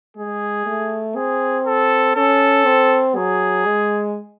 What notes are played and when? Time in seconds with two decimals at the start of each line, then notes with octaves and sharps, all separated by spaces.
0.17 G#3 G#4
0.66 A3
1.16 C4 G#4
1.66 A4
2.16 C#4 A4
2.65 C4
3.16 F#3 G#4
3.66 G#3